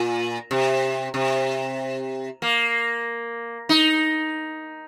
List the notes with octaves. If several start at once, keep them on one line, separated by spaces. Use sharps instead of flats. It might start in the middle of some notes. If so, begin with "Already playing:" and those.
Already playing: A#2
C3
C3
A#3
D#4